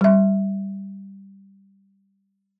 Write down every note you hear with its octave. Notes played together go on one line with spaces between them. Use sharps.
G3 E5